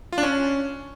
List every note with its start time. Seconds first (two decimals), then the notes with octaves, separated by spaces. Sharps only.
0.12 F4
0.18 D4
0.23 C#4